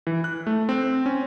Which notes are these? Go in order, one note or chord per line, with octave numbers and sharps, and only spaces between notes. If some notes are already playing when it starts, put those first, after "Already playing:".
E3
F#6
A3
C4
C#4